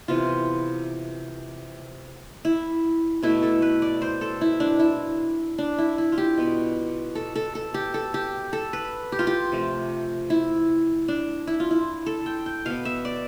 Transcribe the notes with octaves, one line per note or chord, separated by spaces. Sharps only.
C3 E3 B3 F4
E4
B2 A3 E4
A4
B4
D5
C5
A4
E4
D4
E4
D4
E4
E4
F4
G4
B2 B3
A4
A4
A4
G4
A4
G4
A4
B4
G4
F4
G4
C3 F3 A3
E4
D4
E4
F4
E4
A4
G5
G5
B2 B3 F5
E5
D5